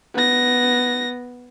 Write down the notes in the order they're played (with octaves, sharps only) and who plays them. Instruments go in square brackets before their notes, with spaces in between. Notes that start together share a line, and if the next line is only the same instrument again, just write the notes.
[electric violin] B3 A#6